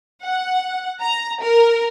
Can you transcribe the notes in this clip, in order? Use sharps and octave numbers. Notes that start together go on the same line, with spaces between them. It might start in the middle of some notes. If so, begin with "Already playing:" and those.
F#5
A#5
A#4